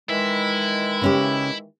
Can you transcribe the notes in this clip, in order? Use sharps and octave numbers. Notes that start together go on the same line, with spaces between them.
D#3 E3 G#3 E4
C#3 C#4 G4